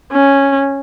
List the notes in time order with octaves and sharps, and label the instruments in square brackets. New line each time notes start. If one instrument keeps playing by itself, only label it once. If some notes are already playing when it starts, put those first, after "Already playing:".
[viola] C#4